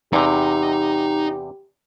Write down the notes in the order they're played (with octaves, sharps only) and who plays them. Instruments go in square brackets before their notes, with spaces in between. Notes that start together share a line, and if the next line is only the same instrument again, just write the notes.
[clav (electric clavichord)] E2 C3 [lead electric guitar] D#4 A#5 [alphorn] G4